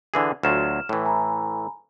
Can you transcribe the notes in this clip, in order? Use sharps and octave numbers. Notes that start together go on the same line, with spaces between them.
D3 E3 G#4
D2 F#3 F4 F6 E7
A2 E3
G#5 A#5 B5